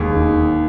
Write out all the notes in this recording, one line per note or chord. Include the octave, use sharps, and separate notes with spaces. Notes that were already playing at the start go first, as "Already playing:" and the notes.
Already playing: E1 D#2 G#4
D#3